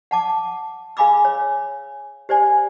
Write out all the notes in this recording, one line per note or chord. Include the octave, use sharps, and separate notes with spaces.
F#5 A5 D6
G#4 F5 G#5 B5 D6 E6
C#5
G4 C5 D5 G#5